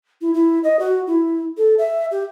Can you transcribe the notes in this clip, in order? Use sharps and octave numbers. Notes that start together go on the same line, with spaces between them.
E4
E4
D#5
F#4
E4
A4
E5
G4